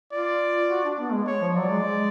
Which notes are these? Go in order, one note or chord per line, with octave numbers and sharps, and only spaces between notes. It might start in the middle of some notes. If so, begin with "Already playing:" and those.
F4 D5
F#4
D4
B3
G#3
C#5
F3
F#3 D5
G#3
G#3